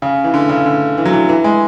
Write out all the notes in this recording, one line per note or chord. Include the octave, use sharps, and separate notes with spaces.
C#3
E3
D3
C#3
D3
E3
F#3
E3
E3
G#3